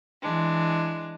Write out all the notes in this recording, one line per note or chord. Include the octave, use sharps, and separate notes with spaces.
E3 G#3 D4